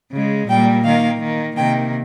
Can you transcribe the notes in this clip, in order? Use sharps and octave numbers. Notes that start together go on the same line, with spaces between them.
C#3 G#3
A#2 G3 A#3 G5
D#3 A#3 F5
D#3 A#3
C3 D#3 A#3 G5